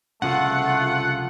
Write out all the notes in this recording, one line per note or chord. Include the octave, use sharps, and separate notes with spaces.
C2 C#3 F3 A3 F4 F#5